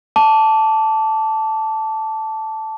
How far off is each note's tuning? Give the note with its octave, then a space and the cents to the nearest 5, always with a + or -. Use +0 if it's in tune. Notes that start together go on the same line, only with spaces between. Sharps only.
A5 +0 D6 -25